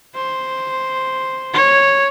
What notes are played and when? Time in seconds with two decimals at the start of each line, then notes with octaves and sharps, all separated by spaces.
0.15 C5
1.54 C#5